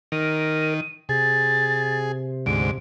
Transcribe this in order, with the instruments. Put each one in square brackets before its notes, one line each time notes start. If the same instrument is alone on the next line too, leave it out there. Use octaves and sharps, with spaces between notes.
[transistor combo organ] D#3 [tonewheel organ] A#4 [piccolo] D#7
[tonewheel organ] C3 [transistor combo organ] G#4 [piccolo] A6
[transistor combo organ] D2 G#2 [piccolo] D7